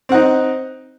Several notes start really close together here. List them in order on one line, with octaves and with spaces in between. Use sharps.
C4 F#5 D#4